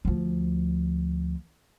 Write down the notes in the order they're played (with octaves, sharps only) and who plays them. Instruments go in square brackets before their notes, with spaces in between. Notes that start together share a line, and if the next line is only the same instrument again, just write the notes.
[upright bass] D2 F3